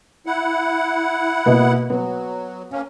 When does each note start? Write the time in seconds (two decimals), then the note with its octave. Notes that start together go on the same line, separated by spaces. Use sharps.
0.26 E4 F#5
1.46 B2 A#3 B3
1.90 F#3 B3
2.72 A#3 C#4